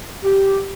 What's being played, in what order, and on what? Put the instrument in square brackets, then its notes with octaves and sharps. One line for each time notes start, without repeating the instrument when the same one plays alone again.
[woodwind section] G4